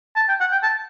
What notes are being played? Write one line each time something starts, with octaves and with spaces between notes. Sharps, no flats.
A5
G5
F#5
G5
A5